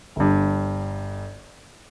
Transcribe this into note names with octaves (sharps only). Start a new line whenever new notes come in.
G1 G2